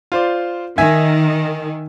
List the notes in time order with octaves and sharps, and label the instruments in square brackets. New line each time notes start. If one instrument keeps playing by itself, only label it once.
[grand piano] F4 C5 D5
[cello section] D#3 [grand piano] E5 G#5 G#6